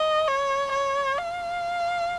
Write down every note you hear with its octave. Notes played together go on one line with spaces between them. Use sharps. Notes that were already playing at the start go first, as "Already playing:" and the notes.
Already playing: D#5
C#5
C#5
F5